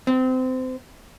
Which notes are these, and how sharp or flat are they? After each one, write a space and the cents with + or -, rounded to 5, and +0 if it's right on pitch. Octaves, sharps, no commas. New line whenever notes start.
C4 -25